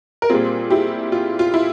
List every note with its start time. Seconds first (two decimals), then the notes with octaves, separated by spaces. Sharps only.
0.22 A#4
0.30 A#2 G3 C4 F4 G#4
0.70 E4 G4
1.12 F4
1.39 F4
1.54 E4